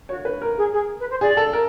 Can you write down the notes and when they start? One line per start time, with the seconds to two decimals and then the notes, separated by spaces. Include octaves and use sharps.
0.09 F#4 C#5
0.25 B4
0.42 A#4
0.57 G#4
0.73 G#4
1.00 B4
1.10 C5
1.21 G#4 D5
1.37 A4
1.53 A#4